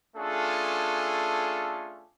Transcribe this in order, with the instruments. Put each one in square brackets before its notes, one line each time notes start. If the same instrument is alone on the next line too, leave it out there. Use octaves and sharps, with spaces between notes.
[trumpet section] A3 C#4 D4 F4 G#4 A4